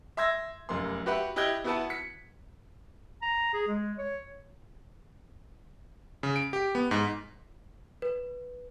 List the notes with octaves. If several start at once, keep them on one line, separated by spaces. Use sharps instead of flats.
E5 C6 E6 G#6 A#6
F1 F#2 A#3 C6
F#4 G4 B4 E5 F#5 B5
E4 G4 D#5 F#6 G#6 G7
B3 E4 F#4 B4 F#5 A5
B6 C#7
A#5
G#4
G#3
C#5
C#3
D7
G4
B3
G#2
B4